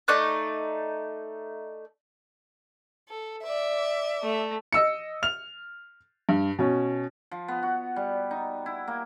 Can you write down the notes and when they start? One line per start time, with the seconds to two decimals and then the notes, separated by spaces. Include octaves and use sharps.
0.08 A3 D#4 D5 F#6
3.09 A4
3.44 D5 E5
4.23 A3
4.73 D#5 E6 C#7
5.23 F6 F7
6.29 G2
6.59 B2 C#4
7.31 F3
7.48 B3
7.63 F#4
7.96 G3
8.31 D#4
8.66 E4
8.88 A#3